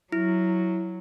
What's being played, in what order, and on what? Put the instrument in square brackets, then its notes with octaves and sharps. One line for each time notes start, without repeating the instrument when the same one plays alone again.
[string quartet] F#3 [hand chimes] E4